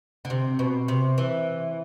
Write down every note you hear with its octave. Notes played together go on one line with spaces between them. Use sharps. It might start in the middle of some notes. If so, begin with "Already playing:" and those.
D3
C3
B2
C3
E3